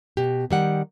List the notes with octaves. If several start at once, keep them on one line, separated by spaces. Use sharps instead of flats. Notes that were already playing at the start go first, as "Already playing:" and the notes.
B2 G4
D#3 G3 F#5